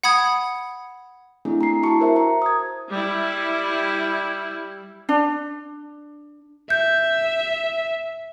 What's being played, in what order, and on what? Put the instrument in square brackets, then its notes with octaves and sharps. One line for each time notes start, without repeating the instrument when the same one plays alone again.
[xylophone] F#5 B5 D#6 G#6
[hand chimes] A3 C4 D4 E4 G#4
A#5 C7
E4 F#4 A5 C#6 C#7
F#4 A#4 C5 E5
A#5
D#6 G#6
[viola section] G3 E4
[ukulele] D4
[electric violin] E5 [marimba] G6